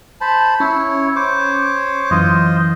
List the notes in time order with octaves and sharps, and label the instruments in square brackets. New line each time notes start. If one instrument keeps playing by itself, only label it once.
[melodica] C5 A5 B5
[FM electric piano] C#4 [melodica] E4 C#5
[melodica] C5 C#5 D6
[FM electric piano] F#2 E3 [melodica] F4 C5 D#5